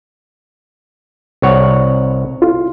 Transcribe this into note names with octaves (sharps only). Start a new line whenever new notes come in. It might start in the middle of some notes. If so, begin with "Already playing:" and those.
C2 C#5 F#5
F4